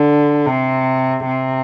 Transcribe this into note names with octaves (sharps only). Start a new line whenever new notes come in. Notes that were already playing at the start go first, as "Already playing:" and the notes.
Already playing: D3
C3
C3